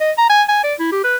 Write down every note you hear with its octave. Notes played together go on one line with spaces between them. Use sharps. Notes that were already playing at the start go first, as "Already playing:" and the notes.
D#5
A#5
G#5
G#5
D5
E4
G4
B4